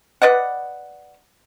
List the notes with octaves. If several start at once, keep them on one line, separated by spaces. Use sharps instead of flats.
B4 D5 D#5 F#5